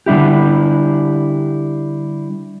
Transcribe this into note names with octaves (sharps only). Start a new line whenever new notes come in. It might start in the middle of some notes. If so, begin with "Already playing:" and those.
D3 G3 D4 E4 G4